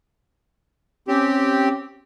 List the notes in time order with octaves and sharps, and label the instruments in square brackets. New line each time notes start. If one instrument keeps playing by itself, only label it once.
[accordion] C4 G4 [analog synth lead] C#4